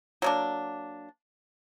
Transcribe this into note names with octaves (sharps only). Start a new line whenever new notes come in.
F#3 A#3 D4